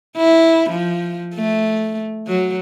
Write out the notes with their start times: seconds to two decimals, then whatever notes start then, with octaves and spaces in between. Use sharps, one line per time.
0.17 E4
0.70 F3
1.35 A3
2.28 F#3